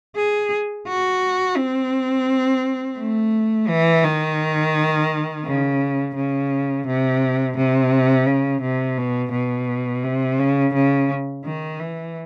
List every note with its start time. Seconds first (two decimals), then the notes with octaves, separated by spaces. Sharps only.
0.16 G#4
0.88 F#4
1.57 C4
2.98 A3
3.68 E3
4.05 D#3
5.45 C#3
6.15 C#3
6.87 C3
7.57 C3
8.27 C#3
8.62 C3
8.98 B2
9.32 B2
10.04 C3
10.39 C#3
10.74 C#3
11.45 D#3
11.80 E3